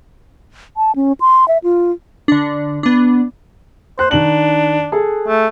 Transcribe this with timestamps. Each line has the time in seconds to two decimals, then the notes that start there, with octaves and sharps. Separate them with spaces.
0.77 A5
0.96 C#4
1.21 C6
1.48 E5
1.64 F4
2.28 D3 D4
2.83 B3 D4
3.99 C5 F#6
4.11 D#3 D4 F#7
4.92 G#4 A4
5.28 A3